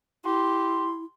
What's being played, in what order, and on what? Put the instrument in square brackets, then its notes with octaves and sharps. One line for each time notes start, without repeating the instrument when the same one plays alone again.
[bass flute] E4 [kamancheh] G4 [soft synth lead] C6